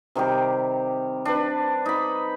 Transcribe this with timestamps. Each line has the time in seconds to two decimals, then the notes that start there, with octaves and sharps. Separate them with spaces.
0.15 C3 D#3 G3 G4
1.25 D4 B4
1.86 D#4 B5